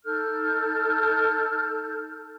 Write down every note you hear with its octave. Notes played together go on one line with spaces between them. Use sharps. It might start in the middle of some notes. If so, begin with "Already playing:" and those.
D#4 A4 F6 G6